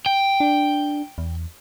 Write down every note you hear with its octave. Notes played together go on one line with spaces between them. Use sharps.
G5
D4
E2